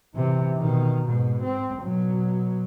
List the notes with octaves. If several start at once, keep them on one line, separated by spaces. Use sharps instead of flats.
C3 E3
B2 D#3
G#2 B2
C4
B2 F#3